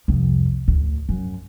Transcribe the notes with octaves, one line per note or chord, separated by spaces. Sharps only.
C2 F2
D2 A2
F#2